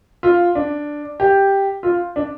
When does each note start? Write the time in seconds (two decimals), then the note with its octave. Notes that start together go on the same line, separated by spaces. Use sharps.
0.23 F4
0.55 D4
1.20 G4
1.83 F4
2.16 D4